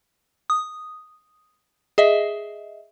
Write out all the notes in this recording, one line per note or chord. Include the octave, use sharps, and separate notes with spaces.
D#6
G#4 D#5 E5